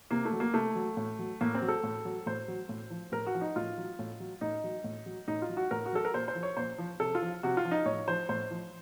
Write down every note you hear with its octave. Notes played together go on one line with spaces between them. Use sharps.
C3 A#3
A3
F#3
A#3
C3 A3
F#3
A2
F#3
A2 A#3
C4
F#3
A4
A2
F#3
A2 C5
F#3
A2
F3
A2 A#4
F#4
F3
D#4
A2 F4
F#3
A2
F#3
A2 D#4
F#3
A2
F#3
A2 D#4
F4
F#3
F#4
A2 A#4
F#4
F#3 A4
A#4
A#2 C5
C5
F3
C#5
A#2 C5
F3
C3 A4
F4
F3
C3 F#4
F4
F3
D#4
A2 C#5
F3 C5
A2 C5
F3